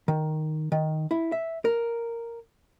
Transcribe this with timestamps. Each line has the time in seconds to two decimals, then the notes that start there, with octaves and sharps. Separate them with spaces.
0.08 D#3
0.72 D#3
1.11 E4
1.32 E5
1.65 A#4